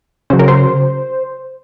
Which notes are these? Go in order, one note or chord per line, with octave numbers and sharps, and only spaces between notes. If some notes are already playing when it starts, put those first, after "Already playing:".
C#3 F#3 C5
A#4
C5